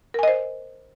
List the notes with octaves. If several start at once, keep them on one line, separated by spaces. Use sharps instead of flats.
A#4 C5 D#5 G#5